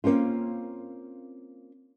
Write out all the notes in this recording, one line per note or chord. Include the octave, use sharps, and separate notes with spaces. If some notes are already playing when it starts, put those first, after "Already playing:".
A#3 C4 C#4 F4